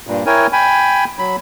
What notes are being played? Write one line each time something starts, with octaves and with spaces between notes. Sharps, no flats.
G2 A#2
E4 A#4 C#5 G5 G#5
G5 G#5 B5
F#3 B5